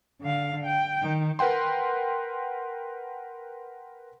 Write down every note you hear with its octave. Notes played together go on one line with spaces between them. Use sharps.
D3 F5
G5
D#3
A#4 B4 F#5 G5 C6